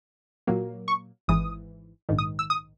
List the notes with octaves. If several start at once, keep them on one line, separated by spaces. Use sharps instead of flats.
A#2 F#3 A#3
C#6
G#1 G#2 E3 D#6
A#1 G#2 D#3
D#6
E6
D#6